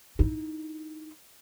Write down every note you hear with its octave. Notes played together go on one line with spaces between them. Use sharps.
D#4 E4